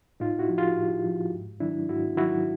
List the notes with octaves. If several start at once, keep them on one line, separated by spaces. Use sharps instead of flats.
A2 D#4 F4
E4 F#4
F3
F4 G4
A2
F3
G#2
D#3 F#3 D4 E4
G#2 E4 F#4
D#3 F#3 E4 F#4